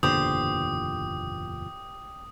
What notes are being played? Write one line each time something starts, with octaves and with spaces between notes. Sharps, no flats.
F#1 E2 A#2 D3 G4 C5 D#6